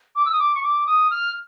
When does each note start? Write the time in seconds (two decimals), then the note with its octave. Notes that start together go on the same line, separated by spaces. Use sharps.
0.15 D6
0.25 E6
0.32 D#6
0.39 D6
0.55 C#6
0.63 D6
0.86 D#6
1.11 F6